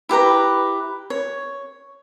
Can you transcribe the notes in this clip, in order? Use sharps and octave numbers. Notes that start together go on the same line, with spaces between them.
E4 G4 B4 A#5
C#5